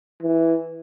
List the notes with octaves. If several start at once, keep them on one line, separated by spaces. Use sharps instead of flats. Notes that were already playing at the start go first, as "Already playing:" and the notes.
E3